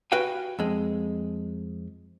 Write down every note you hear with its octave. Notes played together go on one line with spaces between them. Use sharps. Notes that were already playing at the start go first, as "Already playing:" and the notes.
F#4 B4 F5 G5 G#5
F2 G#3